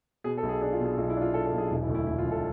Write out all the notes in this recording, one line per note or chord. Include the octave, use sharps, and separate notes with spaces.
B2 G#4
A4
B1
G#4
D4 G#4
F4
B2
G#4
B1 F4
E4
D4
F4
D4 A4
A4
B1
G#4
E1 E4
E4
D2
E4
E1 E4
F4
E1
A4